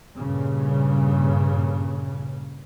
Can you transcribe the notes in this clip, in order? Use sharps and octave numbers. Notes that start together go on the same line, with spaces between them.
G2 A#2 C#3